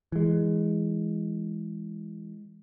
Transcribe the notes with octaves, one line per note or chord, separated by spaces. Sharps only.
E3 G#3